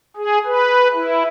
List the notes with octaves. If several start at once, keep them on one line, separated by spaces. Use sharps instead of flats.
G#4
B4
E4